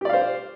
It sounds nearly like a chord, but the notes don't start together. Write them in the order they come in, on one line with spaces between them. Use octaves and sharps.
G4 D5 F5 C5